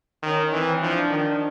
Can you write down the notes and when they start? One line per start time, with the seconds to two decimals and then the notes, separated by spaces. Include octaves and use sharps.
0.22 D#3 C#4
0.52 E3 C4
0.82 F3 D4
1.10 D#3